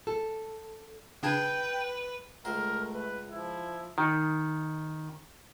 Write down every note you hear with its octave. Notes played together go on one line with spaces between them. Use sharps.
A4
C#3 D4 B4 G5 G#6
C#2 A3 A#4 C5
B4
F3 E4
D#3